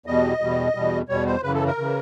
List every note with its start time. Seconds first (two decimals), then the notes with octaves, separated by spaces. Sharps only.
0.06 E2 B2 G3 D#5
0.40 E2 B2 G3
0.75 E2 B2 G3
1.09 E2 B2 G3 C#5
1.26 C5
1.42 F#2 C#3 E3 B4
1.54 A4
1.66 A#4
1.78 C#3 E3